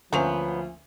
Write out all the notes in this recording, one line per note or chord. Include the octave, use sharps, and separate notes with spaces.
D2 F3 F#3 A#3 B3 C#4 C5 F7